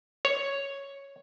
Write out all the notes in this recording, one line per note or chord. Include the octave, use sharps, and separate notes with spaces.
C#5